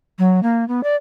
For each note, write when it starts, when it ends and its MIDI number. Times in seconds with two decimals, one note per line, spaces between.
0.19 0.42 54
0.43 0.67 58
0.68 0.83 59
0.83 0.96 74